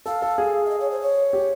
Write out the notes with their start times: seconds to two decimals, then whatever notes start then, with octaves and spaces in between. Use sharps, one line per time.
0.06 A4 F5
0.22 A4
0.38 G#4
0.66 E5
0.70 D#5
0.80 C#5
0.91 C5
1.01 C#5
1.33 G4